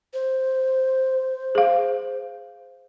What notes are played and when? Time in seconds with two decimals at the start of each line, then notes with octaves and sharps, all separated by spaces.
0.13 C5
1.55 G#4 F5